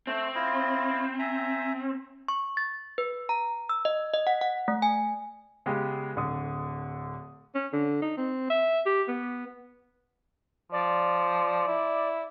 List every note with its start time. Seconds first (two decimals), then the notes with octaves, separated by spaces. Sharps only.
0.07 A3 C4
0.35 E4 F4 D#5
1.19 E5 G#5 A#5
2.28 C#6
2.57 A6
2.98 B4
3.29 A#5
3.69 E6
3.85 D#5
4.14 D#5
4.27 F#5
4.41 F#5
4.68 A3
4.82 G#5
5.66 C#3 G#3 B3 G4
6.16 D1 D3 D#6
7.55 C#4
7.73 D3
8.02 D#4
8.17 C4
8.50 E5
8.86 G4
9.08 B3
10.72 F3 D5
11.67 E4